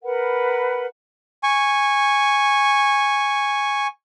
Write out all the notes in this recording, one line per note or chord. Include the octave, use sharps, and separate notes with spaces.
A#4 B4 F#5 B5
G#5 C#6